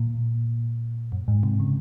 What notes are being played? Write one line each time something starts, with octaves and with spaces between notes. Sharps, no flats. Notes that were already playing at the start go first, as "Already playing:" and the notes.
Already playing: A#2
F#2
G#2
C3
C#3